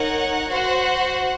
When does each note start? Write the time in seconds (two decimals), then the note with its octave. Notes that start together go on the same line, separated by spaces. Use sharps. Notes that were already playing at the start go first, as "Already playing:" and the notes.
Already playing: D#4 A#4 C#5 F#5
0.49 F#4 C5 F#5